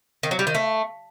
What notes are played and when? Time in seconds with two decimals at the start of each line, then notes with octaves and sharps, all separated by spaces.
0.23 D#3
0.31 F#3
0.39 G3
0.47 D#3
0.55 A3